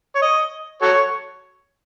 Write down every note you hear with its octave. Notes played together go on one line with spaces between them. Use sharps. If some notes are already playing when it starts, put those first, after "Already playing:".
C#5
D#5
F#4 A4 C#5